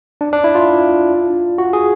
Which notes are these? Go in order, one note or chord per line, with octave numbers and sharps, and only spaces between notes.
D4
D4
E4
F4
F#4
G#4